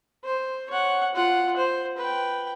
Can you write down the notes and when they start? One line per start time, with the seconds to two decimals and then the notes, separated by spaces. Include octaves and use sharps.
0.24 C5
0.70 C#5 F#5
1.15 F4 F#5
1.56 C5
1.98 B4 G5